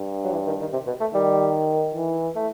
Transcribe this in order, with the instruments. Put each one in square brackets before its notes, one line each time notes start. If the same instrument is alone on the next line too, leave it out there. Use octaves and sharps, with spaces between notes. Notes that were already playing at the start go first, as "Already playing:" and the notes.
Already playing: [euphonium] G2
[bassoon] F#3
E3
D#3
D#3
C3
B2
A3
[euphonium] D#3 [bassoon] G3
[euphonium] E3
[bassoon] A3